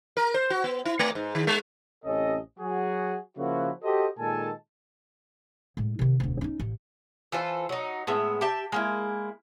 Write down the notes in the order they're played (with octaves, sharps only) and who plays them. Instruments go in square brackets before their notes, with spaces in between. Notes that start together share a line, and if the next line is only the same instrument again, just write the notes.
[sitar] A#4
C5
F#4
B3
E4
A3
G#2
D#3
G#3
[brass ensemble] A1 C3 C#4 A4 D#5
F#3 F#4 G#4
C#3 F3 A#3 E4 F#4
F#4 G4 A4 C5 D#5
A#2 D#3 G#3 A4 G#5 A5
[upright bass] A2 G#3
C3 D#3
E1 D2
C#4 D#4
A1
[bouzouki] E3 F4 A4 C5
F#3 D#4
A2 G#3 B3 E5
G4 E5 G5 A5
G#3 A#3 E4